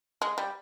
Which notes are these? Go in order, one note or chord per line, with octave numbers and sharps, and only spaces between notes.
G#3
G3